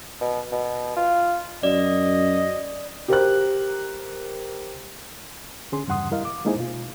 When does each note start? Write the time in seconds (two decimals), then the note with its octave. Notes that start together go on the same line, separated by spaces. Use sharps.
0.21 B2
0.52 B2
0.96 F4
1.63 F#2 D5 D#5
3.08 G4 A#4 C5 F#6
5.72 D3 C#4 G#4 C6
5.87 E2 G2 C#3 F#5 C6 D#6
6.11 G3 E4 A#4 D#5 F5
6.25 D6
6.45 G#3 A#3 D#4 E4 G#4 C5
6.56 B2 F4